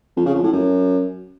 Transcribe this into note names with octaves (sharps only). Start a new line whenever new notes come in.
F2
C#3
F2
A2
F#2